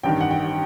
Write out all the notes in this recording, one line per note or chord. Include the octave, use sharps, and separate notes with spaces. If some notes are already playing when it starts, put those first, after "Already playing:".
A1 G2 D#3 G5
F#5
G5